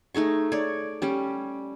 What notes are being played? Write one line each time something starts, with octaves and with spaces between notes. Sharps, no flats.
A3 D#4 G#4 C#6
C#5 D5
G3 C#4 G4